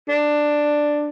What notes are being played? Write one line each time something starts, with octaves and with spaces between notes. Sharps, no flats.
D4